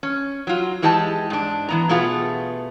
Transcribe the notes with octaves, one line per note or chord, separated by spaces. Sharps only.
C#4
F#3 F4
E3 G#3 G4 D#5 A5
G#2 D4
E3 B3 A#5
B2 A3 B3 F4 G#4